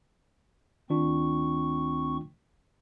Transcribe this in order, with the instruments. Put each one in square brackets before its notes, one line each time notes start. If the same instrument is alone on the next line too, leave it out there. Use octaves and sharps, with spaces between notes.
[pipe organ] D2 C4 C#6 [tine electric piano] D#3 D4 F4